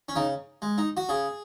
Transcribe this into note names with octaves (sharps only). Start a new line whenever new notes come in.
C#4
C#3 D#4
G#3
D#4
F#4
C#3 G#4